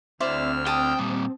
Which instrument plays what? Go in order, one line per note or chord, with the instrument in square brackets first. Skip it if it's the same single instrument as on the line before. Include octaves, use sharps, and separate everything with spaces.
[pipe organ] D2 E6 F6 [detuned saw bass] C4 [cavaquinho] E4 C5 D5
[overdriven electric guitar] G5 [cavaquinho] A5 D#6
[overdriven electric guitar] A#2 G3